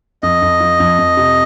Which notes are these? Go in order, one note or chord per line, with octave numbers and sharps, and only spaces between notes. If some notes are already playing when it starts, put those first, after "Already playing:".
F2 D#5
F2
F3
F2
F2
C3